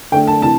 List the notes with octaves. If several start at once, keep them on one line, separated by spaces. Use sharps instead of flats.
D3 A3 D4 G5
A5
C3 E3 A5